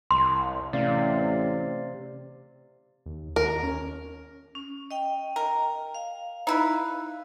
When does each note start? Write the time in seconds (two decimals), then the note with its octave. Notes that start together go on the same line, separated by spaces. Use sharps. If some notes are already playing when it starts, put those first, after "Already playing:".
0.11 C2 C6
0.73 A1 C3 D5 F5
3.06 D#2
3.36 D#2 A#4
3.63 C#4
4.55 C#4
4.91 D#5 G5
5.36 A#4
5.95 F5
6.47 D#4 E4 B4